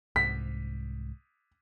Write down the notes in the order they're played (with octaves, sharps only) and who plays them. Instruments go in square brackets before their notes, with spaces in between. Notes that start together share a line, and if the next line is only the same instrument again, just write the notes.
[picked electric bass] C2 G#2 [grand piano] B6